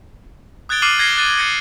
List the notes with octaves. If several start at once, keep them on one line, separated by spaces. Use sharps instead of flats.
D#6 F#6 G#6 A6 D7 G7
D6 F6 F#6 C7 D#7 F#7
G#6 A#6 C7 G7
F#6 A6 D#7
G#6 A#6 C#7 D#7